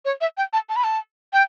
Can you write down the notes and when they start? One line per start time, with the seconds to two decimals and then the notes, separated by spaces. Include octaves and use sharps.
0.05 C#5
0.21 E5
0.37 G5
0.53 A5
0.69 A5
0.76 B5
0.84 A5
1.33 G5